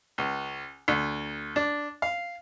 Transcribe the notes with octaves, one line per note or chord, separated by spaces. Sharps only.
C#2
D2
D4
F5